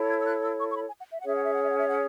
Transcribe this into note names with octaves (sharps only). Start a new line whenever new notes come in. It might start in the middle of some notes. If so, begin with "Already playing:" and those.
Already playing: E4 A4 C#5
G#6
E6
F#6
E6
C#6
C#6
B5
G#5
F#5
E5
F#5
C#4 G#4 C#5 E5
F#5
E5
F#5
E5
F#5
E5
F#5